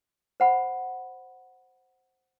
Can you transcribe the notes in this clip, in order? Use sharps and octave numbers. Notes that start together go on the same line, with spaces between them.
C5 F#5 B5